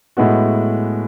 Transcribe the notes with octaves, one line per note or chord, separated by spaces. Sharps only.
A2 G#3 B3 F#4